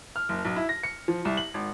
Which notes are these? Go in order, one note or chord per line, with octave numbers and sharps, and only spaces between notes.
F6
F#1
B1
E4
A#6
C#7
F3
C2
F#7
G#1